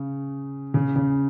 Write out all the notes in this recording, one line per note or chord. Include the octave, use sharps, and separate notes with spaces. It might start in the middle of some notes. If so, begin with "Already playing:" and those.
Already playing: C#3
C#3
C#3